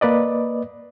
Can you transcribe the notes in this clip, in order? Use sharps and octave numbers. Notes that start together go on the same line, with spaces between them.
A#3 B4 D5 D#5